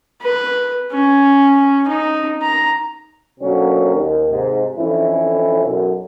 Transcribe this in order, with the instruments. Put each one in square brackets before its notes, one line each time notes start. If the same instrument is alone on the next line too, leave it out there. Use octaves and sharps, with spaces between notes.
[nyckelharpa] B4
C#4
D#4
A#5
[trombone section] B2 D3 F#3 A#3 C4 C#4
D#2
G#2 C3
F2 D3 E3 C#4 E4
B1 F#2